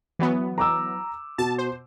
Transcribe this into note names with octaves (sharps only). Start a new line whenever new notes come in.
E3 F#3 B3
A#5 D6 E6
B2 A5
C5